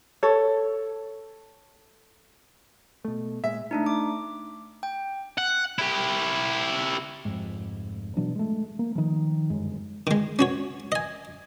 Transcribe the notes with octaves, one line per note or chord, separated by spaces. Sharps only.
A4 C#5
B2 A3
A#2 G#3 E5
A3 D4 D#4
D6
G5
F#5
E4 G4
F1 G#2
B2 E3 F#3 D4
G#3 A3
A#3
D#3 F3
G1 F#2 G#3
D#3 G#3
C#4 F#4 C#5
D#5 G#5